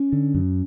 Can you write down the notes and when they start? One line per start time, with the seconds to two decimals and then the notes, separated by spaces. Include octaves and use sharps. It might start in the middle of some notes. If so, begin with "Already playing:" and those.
Already playing: C#4
0.12 D3
0.34 F#2